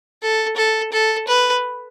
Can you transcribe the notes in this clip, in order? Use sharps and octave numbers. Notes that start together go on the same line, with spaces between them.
A4
A4
A4
B4